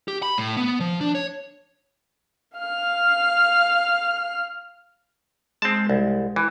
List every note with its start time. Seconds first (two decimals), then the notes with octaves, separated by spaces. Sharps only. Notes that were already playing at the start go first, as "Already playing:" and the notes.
0.08 G4
0.23 B5
0.38 A2
0.57 B3
0.80 F3
1.01 D4
1.15 C#5
2.58 F5 F6
5.62 G#3 C4 A5
5.90 C2
6.36 E3